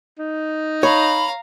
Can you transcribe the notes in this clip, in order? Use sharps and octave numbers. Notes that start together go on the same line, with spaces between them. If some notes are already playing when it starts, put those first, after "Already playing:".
D#4
C#5 F5 A#5 B5